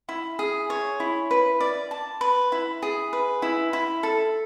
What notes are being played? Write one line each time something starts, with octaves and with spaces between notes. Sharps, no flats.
E4
G#4
C#5
E4
B4
D5
A5
B4
E4
G#4
B4
E4
E4
A4